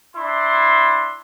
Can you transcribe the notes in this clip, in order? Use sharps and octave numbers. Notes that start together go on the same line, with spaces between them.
D4 E4 C6